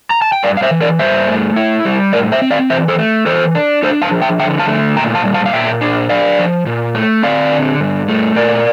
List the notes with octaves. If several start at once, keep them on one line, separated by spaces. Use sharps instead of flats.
A#5
A5
G5
G2 D5 F5
F5
C5 E5
E3
A#4 D5
G2 C5 E5
A3
E4
G3
A2 A#4 D5
C5 E5
C4
D5 F5
E3 C5 E5
A4 C5
A3
E3 A4 C5
D4
D4 A4 C5
F5 A5
F3
E5 G5
D3 E5 G5
F5 A5
A3
A#2 G5 A#5
F5 A5
G3
F5 A5
F5
A#2 E5 G5
D4
D4 D5 F5
F3
A#2
A3
C4 D5 F5
D3
G2
A3
A#2 A#4 D5